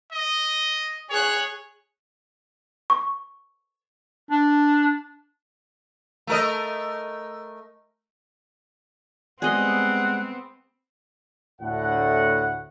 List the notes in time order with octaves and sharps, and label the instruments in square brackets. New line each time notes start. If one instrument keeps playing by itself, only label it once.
[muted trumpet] D#5
[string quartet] G#4 F#6 [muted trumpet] C#5
[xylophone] C#6
[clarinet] D4
[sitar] A3 A#4 D#5
[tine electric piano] G3 G#3 [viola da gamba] B3 C4 [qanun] G#4 D#5 [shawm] F#5
[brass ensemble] D2 A2 F#5